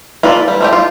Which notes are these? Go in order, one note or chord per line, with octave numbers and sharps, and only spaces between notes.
A#3 F4 A4 B4 D5
E3 G3
F3 A3 G4
F4